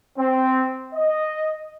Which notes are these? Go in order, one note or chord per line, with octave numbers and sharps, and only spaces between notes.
C4
D#5